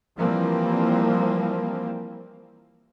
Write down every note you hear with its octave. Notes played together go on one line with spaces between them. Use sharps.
E3 F3 G3 A#3 C4